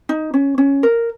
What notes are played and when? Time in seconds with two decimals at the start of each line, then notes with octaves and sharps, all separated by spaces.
0.09 D#4
0.34 C#4
0.58 C#4
0.83 A#4